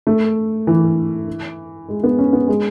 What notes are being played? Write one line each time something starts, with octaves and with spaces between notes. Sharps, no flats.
A3
E3
G#3
B3
C#4
B3
G#3